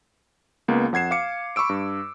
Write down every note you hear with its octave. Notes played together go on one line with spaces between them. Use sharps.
C#2 A#3 B3
F2 F#5 G#6 C7 E7
F5 D6 C#7
B5 C#6 D6 E6 D7
G2